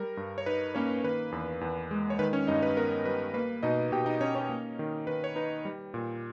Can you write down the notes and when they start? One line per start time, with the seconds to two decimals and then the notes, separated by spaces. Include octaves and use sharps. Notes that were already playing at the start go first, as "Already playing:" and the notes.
Already playing: G3 A#4
0.17 G2
0.38 C#5
0.46 D#4 B4
0.75 A#3 C#4 C#5
1.04 D#3 B4
1.32 E2
1.61 E2
1.91 G#3
2.10 C#5
2.19 D#3 B4
2.33 C#4 C#5
2.47 G2 D#4 D#5
2.62 B4
2.77 B3 A#4
3.05 G3 B4
3.34 A#3 B4
3.63 B2 D#4 D#5
3.92 B2 G4 G5
4.06 D#4 D#5
4.21 C#4 D#4 C#5
4.35 C#4 C#5
4.49 A#3
4.79 D#3
5.07 D#3 B4
5.24 C#5
5.36 D#4 B4
5.65 G3
5.94 A#2